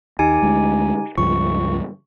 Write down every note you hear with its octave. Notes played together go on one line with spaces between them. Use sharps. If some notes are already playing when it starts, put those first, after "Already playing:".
D#2 D#4 G4 G#5
D2 G#3
C#2 G2 F3 C#6